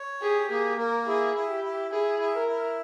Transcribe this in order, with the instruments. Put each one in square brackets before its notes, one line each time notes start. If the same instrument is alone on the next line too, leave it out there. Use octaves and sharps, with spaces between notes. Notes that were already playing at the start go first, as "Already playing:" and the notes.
Already playing: [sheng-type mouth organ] C#5
[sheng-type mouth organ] G4 [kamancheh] G#4
[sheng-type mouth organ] A#3 [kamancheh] G#4
[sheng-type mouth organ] A#3 [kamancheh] A#4
[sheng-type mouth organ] E4 [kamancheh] G#4
[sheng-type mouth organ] E4
[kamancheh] G4
[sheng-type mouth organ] E4
[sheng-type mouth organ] E4 [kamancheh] G#4
[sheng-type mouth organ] E4
[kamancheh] A#4
[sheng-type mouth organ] E4